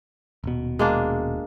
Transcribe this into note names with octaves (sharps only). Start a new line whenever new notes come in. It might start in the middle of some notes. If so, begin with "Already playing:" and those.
D#1 B2
G#3 A#3 D4